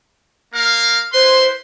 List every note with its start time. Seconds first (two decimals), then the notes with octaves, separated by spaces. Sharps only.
0.54 A#3 A#4 F5
1.14 E4 B4 C5 C6